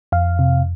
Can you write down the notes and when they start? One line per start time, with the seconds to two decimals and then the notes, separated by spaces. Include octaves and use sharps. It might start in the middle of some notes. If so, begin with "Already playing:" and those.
0.12 F2 F5
0.39 C3